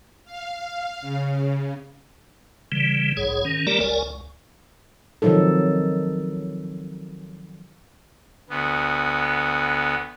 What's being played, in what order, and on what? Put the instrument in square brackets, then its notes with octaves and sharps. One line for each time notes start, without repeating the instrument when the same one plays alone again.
[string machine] F5
C#3
[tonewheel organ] C#3 E3 G3
F#1 B1 G#2 G#4 C#5
D#3 C#4
G3 A3 G4 A#4 D5 A#5
F#1 C#2 A#4 D5 G#5
C#2
[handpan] C3 D#3 F3 F#3 D#4 A4
[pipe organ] D2 B3